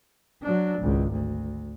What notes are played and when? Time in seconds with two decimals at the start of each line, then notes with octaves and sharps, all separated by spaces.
0.42 F#3 D4
0.78 G#1 C#2
1.12 D2